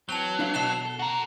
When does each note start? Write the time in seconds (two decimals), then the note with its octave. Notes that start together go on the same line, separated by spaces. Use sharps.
0.09 E3 F#3 C4 A5 F7 G7
0.39 D4 E4 F5
0.54 B2 A5 C7 E7 G7
0.85 A4
0.99 F#4 A4 A#4 A#5